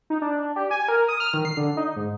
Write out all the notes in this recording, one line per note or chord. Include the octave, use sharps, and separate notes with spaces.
D#4
D4
G4
G#5
A#4
D#6
F6
D#3
C7
D3
D#4
G#2